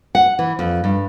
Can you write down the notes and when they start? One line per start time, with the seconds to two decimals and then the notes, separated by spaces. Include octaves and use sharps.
0.15 F#5
0.39 E3
0.59 F2
0.84 G2